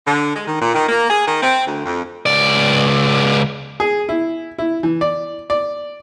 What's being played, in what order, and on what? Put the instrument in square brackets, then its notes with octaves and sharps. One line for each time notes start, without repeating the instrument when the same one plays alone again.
[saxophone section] D3
G#3
D#3
A#2
D#3
A#3
G#4
D#3
C4
D2
F2
[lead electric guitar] C#2 D5
[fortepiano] G#4
E4
E4
E3
D5
D5